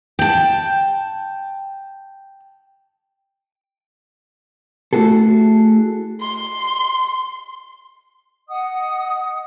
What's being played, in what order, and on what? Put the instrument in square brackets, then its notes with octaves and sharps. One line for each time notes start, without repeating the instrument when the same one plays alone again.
[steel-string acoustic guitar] G5 A5
[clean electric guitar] A3 E4 F#4 G#4 A4
[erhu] C6
[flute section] D#5 F#5 D#6